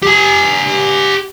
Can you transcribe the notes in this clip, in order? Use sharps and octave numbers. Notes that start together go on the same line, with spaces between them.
G4 G#5